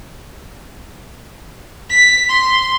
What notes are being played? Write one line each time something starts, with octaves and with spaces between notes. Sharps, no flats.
B6
C6